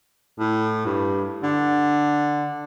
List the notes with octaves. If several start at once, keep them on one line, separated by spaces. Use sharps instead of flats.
A2
G2
D3